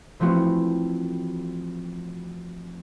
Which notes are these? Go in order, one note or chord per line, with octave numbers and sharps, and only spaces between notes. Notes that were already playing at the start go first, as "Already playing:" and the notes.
E3 F3 A3 C4 F#4